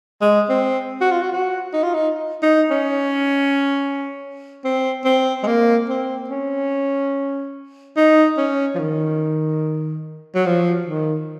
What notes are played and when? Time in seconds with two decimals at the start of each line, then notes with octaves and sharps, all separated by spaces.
0.21 G#3
0.49 C4
1.01 F#4
1.11 F4
1.21 F#4
1.32 F#4
1.73 D#4
1.83 F4
1.94 D#4
2.42 D#4
2.70 C#4
4.64 C4
5.05 C4
5.43 G#3
5.47 A#3
5.89 C4
6.29 C#4
7.97 D#4
8.37 C#4
8.75 F3
8.79 D#3
10.35 F#3
10.46 F3
10.87 D#3